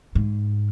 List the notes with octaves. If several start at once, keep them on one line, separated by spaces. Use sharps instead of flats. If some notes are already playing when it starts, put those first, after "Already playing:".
G#2